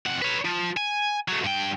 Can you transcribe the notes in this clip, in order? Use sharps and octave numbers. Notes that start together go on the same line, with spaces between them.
F2 F#5
B4 C#5
F3
G#5
F#3 A3
G2 G5